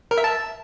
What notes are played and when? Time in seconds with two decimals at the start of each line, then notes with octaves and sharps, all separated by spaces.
0.11 A#4
0.18 E5
0.24 A5